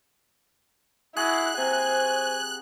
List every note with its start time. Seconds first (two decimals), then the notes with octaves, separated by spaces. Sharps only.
1.17 E4 F#4 G#4 F#6
1.58 C3 C5 G#5